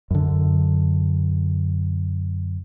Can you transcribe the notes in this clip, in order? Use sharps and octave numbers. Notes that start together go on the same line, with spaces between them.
F#2 D3